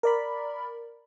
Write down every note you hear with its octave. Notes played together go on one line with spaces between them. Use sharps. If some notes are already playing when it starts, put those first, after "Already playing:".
A#4 D5 B5